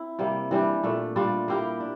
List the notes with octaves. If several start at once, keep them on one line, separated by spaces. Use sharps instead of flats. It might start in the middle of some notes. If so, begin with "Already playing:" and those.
Already playing: C4 E4
C3 G3 A#3
E3 G3 D4 G4
A#2 A3 D4
G3 D4 F4
A#3 E4 G4 A#4
D4